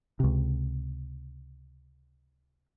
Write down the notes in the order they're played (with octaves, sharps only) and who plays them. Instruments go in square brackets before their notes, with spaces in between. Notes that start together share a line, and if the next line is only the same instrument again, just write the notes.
[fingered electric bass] C#2 C3